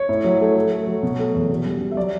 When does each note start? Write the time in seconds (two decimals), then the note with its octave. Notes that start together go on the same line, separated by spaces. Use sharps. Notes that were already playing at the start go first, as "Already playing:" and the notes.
Already playing: C#5
0.09 A2
0.24 F#3
0.41 A3
0.56 A3
0.71 A3
0.87 F#3
1.03 B2
1.19 A3
1.34 E2
1.50 B2
1.66 G3
1.81 G3
1.91 E5
1.97 F#3 D5